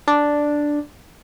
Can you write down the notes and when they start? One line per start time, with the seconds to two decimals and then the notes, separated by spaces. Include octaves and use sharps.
0.08 D4